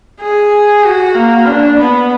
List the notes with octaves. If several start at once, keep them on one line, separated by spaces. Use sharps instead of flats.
G#4
F#4
A#3
D4
B3